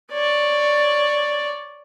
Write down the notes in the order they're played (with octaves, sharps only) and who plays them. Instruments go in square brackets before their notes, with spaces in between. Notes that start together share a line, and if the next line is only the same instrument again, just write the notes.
[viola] C#5 D5